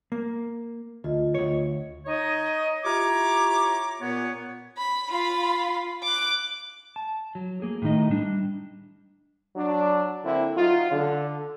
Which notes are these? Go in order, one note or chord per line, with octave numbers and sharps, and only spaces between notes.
A#3
D2 F4 D#5
D2 C#5
D#4 C#5 D#5
E4 F4 G4 C#5 A#5 D6
A#2 B3 C#5
B5
F4 B5
D6 F#6
A5
F#3
A#3 G#4
A2 D#3 D#4 D#5
G3 D4
F#3 D4
D3 A#3 C4 E4
F#3 D#4 F4
D3